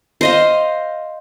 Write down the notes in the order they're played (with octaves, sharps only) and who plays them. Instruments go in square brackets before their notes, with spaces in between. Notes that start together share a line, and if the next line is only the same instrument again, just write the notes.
[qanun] C5 D#5 F5